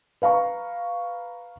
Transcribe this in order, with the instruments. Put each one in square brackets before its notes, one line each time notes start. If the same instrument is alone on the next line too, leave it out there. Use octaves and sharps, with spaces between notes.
[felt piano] B4 F5 A#5 C#6